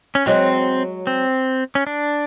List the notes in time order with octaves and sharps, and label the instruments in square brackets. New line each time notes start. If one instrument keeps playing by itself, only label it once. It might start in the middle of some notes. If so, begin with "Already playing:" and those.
[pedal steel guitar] C#4
[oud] F#3 G#3 [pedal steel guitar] C4
[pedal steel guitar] C4
C#4
D4